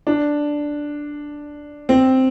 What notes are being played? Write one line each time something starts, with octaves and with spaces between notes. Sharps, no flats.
D4
C4